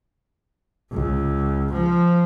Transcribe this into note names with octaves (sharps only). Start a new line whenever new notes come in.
C#2
F3